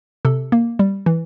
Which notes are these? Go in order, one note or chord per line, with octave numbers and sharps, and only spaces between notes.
C3 A4
A#3
G3
E3